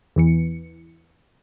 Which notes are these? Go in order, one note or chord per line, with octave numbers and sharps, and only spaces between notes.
E2 E3 C#7